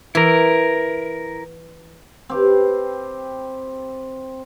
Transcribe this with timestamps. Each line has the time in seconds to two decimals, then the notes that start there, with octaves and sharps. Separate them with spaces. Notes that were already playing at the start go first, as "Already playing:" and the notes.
0.15 E3 E4 A#4
2.29 C4 G4 B4